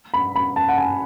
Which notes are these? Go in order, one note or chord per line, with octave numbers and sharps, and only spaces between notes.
B5
B5
A5
F#5
G#5